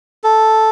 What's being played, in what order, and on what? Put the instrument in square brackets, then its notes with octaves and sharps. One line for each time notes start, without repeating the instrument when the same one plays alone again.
[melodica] A4